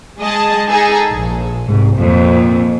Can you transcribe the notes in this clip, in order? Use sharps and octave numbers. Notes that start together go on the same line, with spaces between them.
G#3 G#4 D#5 A5
D#4 G#4 A4
A#1
C2 G#2
F2 A#2